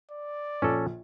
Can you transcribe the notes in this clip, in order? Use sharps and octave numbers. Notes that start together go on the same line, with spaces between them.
D5
A#1 C#4 A4